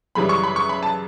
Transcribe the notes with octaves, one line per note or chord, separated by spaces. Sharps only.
F#2 C#3 E3 G3 B5
C#6
B5
C#6
B5
A5